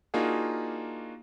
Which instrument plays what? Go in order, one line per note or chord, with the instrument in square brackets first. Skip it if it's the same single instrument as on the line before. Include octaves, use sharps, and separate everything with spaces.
[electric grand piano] A#3 D4 D#4 F4 F#4 G#4